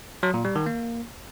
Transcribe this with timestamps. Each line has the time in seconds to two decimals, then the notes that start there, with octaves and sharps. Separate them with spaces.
0.23 F#3
0.34 A#2
0.45 G3
0.55 D#3
0.66 A#3